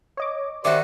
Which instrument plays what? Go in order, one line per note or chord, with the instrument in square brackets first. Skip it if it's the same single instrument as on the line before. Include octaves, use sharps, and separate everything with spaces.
[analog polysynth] C#5 D#5 D6
[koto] D#3 F#4 [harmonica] G4 C5 D5 [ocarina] E5 [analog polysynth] D6